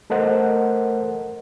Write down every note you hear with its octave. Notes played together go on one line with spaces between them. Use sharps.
A3 A4 A#4 C5 D#5 F#5